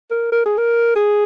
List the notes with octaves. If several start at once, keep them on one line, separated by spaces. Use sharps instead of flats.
A#4
A#4
G#4
A#4
G#4